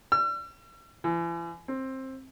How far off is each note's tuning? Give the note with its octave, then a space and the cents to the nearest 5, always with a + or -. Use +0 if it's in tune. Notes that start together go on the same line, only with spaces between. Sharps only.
E6 +45
E3 +40
C4 +15